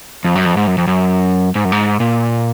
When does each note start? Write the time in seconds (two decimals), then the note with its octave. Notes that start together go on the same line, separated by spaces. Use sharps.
0.25 F2
0.35 F#2
0.45 F2
0.57 G#2
0.67 F#2
0.78 F2
0.87 F#2
1.55 G#2
1.65 F#2
1.72 G#2
2.00 A#2